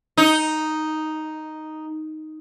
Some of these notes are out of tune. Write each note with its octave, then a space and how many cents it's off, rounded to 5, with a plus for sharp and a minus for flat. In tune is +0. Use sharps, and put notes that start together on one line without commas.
D#4 +0